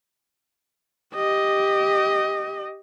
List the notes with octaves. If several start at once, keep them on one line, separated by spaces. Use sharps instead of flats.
G4 D#5